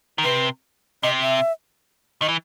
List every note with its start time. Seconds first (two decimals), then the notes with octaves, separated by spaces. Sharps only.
0.18 D#3
0.24 C3 B4
1.03 C3 D#5
1.22 E5
2.21 D#3 D#5
2.28 E3